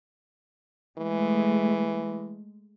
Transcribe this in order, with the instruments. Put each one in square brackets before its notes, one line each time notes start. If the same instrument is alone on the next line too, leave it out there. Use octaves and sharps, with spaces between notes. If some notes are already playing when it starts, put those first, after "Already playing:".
[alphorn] E3 [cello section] G#3 A3